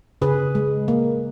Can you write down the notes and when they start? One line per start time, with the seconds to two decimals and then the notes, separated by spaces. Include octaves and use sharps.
0.22 C#3 G#4 B4
0.55 G#3
0.88 A#3